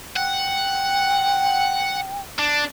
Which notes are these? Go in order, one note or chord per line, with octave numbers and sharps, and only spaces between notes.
F#5 G5
D4